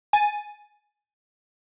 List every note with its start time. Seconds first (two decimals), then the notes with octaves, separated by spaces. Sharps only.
0.13 G#5 A6 D#7